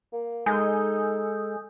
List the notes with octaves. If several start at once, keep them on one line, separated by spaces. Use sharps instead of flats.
A#3
G#3 D#4 A4 G#5 D#6 G6